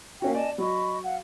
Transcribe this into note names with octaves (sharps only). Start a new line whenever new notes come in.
A#3 C#4 F#4 E5 F5 G5
D5 D#5 G#5 A5
F#3 D#5 B5 C#6
F5 F#5